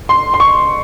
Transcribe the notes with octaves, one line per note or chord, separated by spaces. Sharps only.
C6
C6
C#6